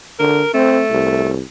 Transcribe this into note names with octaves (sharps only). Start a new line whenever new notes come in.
D3 A#4
A3 C4
C2